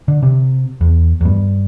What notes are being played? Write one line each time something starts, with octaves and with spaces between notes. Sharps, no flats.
D3
C3
E2
E2
G2